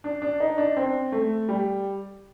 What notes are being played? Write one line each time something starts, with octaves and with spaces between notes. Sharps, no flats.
D4
D4
D#4
D4
C4
A3
G3